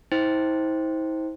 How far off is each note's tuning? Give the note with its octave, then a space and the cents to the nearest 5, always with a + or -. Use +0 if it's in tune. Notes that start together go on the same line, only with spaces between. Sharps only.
E4 -45 C5 +0 G5 +0